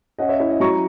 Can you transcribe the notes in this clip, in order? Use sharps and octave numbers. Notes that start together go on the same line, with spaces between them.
C#4 D#5 F#5
C#5 E5
E4 C#5
D#5
F#3 A#5 C#6